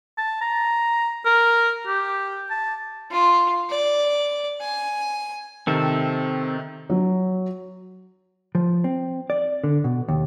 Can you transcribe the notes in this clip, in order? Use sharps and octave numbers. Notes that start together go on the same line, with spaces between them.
A5
A#5
A#4
G4
A5
F4
D5
G#5
C3 D#3 C4 A4 A#4 E5
F#3
F3
C4
D5
D3
B2
D#2